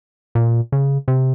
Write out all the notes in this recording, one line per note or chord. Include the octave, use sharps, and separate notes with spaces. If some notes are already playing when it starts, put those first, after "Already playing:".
A#2
C#3
C3